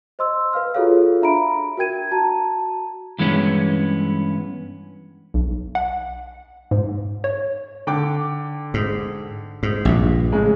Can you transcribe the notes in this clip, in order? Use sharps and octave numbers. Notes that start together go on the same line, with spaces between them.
C5 D#5 C6 E6
B4 F5 F6
F4 F#4 G#4 A4 C#5 F5
D4 E5 A#5 B5 D7
F#4 A#4 G5 G#6 D#7
F#4 A5 A#5
G2 E3 G#3 B3 C#4
B1
F#5
G#2
C#5
D3 G5 D6
G#2
G#2
A#1 G2
A2 C#3 G#3